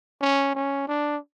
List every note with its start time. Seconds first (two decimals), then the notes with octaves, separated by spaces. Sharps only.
0.21 C#4
0.55 C#4
0.88 D4